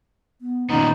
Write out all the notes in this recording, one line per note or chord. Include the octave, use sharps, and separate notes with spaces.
B3
A#2 D#3 B3 C#4 D#4